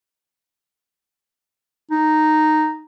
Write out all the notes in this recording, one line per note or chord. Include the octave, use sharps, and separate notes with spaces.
D#4